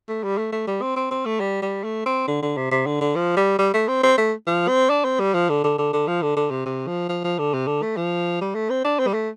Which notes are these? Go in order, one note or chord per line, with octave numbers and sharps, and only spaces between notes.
A3
G3
A3
A3
G3
C4
C4
C4
A3
G3
G3
A3
C4
D3
D3
C3
C3
D3
D3
F3
G3
G3
A3
C4
C4
A3
F3
C4
D4
C4
G3
F3
D3
D3
D3
D3
F3
D3
D3
C3
C3
F3
F3
F3
D3
C3
D3
A3
F3
G3
A3
C4
D4
C4
G3
A3